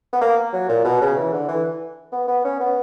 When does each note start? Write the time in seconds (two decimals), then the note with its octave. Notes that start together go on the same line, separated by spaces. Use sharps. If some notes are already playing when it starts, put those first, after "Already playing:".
0.13 B3
0.21 A#3
0.53 F#3
0.69 A#2
0.85 B2
1.01 C#3
1.17 E3
1.32 D3
1.48 E3
2.12 B3
2.28 B3
2.44 C#4
2.60 B3